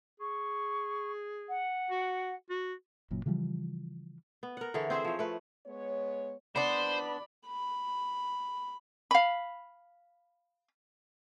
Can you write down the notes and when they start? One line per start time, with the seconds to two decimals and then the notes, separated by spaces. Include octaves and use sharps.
0.20 G#4 C#6
1.48 F#5
1.91 F#4
2.50 F#4
3.11 F#1 F#2 A#2
3.26 C#3 E3 F3 G3
4.43 B3
4.57 A#4 F#5
4.74 D3 E3 G#4 C#5
4.90 C4 G#4 C5 E5
5.05 F3 C#5
5.19 A3 B4
5.66 G#3 B3 C#5
6.56 B3 D4 C5 D5 B5
7.47 B5
9.11 F5 B5